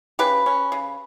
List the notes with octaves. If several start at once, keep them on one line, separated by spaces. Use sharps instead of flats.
C#3 G4 B4
C#4
C#3